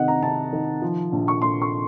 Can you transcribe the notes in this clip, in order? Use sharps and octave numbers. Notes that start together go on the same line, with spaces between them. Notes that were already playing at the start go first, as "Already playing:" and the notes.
Already playing: C3 D#3 D#5 F#5
A#5
C3 A5
D#3
F3
A#1
C#6
A#1 C6
C#6